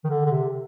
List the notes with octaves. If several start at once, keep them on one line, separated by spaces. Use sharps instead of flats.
D#3
D3
D3
C3